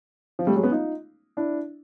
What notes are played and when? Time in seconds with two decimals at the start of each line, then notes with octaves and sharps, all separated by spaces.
0.39 F3
0.47 G3 A3
0.56 F#3 G#3
0.64 B3 C#4
0.72 D#4 F4
1.37 D4 E4